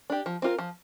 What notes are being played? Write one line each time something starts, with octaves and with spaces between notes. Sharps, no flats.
D4 G4
F3
C4 F4 A#4
F3